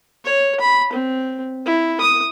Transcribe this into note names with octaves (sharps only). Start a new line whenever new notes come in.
C#5
B5
C4
E4
D#6